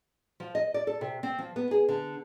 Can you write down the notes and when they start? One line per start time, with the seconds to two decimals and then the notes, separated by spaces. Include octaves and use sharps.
0.40 F3
0.55 D#5
0.74 D5
0.87 A4
1.01 C3
1.23 C4
1.39 F3
1.56 B3
1.71 G#4
1.89 D3